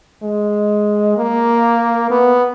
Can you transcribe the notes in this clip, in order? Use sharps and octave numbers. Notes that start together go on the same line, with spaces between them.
G#3
A#3
B3